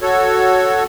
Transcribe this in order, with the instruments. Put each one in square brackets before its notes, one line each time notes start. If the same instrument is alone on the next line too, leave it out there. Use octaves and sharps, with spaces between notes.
[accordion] F#4 A4 C#5